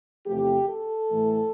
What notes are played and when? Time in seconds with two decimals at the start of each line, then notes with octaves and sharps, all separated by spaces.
0.25 E2 C3 F3 A3 G4
0.67 A4
1.10 A2 E3 A3